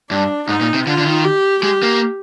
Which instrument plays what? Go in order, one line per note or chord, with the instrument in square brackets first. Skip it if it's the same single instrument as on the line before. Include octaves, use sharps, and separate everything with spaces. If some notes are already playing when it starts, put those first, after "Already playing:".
[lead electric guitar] G2 [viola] D4
[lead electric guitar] G#2 [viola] D#4
[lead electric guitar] A#2
C3
[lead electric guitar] D3 [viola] F4
[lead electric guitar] D3
D#3
[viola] G4
[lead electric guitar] G#3 [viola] G4
[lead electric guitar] A#3